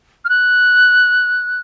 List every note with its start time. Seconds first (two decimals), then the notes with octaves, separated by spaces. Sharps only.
0.25 F6
0.29 F#6